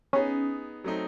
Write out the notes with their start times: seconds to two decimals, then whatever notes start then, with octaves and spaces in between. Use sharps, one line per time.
0.13 B3 C#4 D#4 G#4
0.84 F#3 A3 C4 D#4